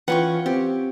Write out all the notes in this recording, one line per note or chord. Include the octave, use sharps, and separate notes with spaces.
E3 C#4 F4 B4 F#5 G5 C#6
C4 G4